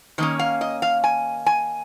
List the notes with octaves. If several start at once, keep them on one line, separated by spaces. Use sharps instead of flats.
D#3 A#3 C#4 D#5
F5
D#5
F5
G#5
G#5